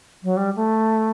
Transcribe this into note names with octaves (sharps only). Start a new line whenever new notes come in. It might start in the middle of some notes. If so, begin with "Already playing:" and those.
F#3
G3
A3